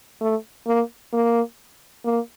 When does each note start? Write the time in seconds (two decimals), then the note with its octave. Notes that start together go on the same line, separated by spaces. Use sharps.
0.21 A3
0.67 A#3
1.13 A#3
2.05 A#3